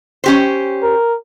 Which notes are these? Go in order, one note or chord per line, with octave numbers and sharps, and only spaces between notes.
C#4 G4 C5
A#4